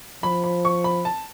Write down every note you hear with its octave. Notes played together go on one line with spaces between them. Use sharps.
F3 B5
B5
C#6
B5
A5